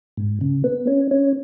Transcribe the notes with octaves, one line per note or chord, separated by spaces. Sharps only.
G#2
C#3
B3
C#4
C#4